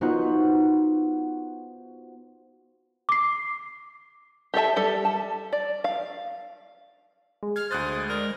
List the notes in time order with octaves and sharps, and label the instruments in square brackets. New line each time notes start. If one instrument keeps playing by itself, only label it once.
[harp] B3 D#4 F4 F#4 C5 F#5
[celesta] D6 C7
[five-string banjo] G4 A4 E5 A5
G3 A4
A5
D5
F5
[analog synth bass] G#3
[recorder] F6 [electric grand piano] G#6
[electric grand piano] D2 F#6 A6 [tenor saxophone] C5 [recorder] D#6
[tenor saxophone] A#4 [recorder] D5